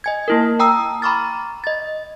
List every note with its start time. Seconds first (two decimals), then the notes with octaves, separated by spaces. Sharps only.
0.04 D#5 G#5 G#6
0.28 A#3 E4 A#4
0.59 G5 A5 A#5 D#6 E6
1.02 A#5 B5 C#6 D6 F6 A6
1.64 D#5 A6